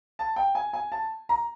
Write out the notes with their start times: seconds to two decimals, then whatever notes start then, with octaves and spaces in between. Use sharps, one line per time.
0.19 A5
0.36 G5
0.55 G#5
0.73 G#5
0.92 A5
1.29 A#5